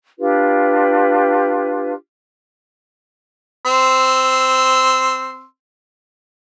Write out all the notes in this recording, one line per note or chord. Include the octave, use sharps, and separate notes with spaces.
D4 F4 G4 B4
C4 C6 E6